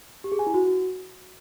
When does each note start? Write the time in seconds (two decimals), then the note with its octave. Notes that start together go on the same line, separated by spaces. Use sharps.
0.24 G4
0.32 G#4
0.39 G#5
0.47 E4
0.54 F#4